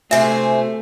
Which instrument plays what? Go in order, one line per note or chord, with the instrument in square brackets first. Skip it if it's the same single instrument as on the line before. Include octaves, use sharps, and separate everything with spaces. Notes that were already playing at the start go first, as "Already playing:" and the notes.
[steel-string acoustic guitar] D2 C3 C5 [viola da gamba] A3 [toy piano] E5 [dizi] G#5